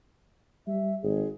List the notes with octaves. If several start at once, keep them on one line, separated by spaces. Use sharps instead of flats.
G3 E5
G#1 G#4